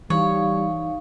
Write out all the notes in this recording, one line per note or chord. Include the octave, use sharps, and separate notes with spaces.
E3 G3 D#4 C#5 F5